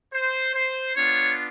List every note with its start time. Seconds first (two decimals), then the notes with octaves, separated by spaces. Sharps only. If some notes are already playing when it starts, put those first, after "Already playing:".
0.14 C5
0.55 C5
0.97 B3 D4 F4 C#5